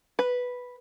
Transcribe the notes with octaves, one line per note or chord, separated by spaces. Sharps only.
B4